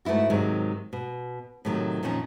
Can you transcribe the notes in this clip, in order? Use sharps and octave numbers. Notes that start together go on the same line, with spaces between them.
G#2 A3 B3 E4 F#4
G#2 C3 D#3 F#3 G#3
B2
A2 C3 D#3 F#3 G3 A3
F2 A#2 D#3 F3 C#4